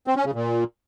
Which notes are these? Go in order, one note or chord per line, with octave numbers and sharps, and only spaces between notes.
C4
C#4
C#3
A#2